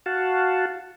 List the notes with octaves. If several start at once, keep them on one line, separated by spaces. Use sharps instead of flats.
F#4 F5 F#5 A5